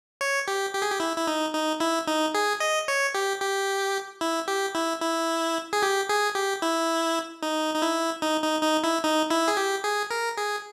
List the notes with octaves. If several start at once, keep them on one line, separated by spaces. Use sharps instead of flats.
C#5
G4
G4
G#4
G4
E4
E4
D#4
D#4
E4
D#4
G#4
D#5
C#5
G4
G4
E4
G4
E4
E4
G#4
G4
G#4
G4
E4
D#4
D#4
E4
D#4
D#4
D#4
E4
D#4
E4
G#4
G4
G#4
A#4
G#4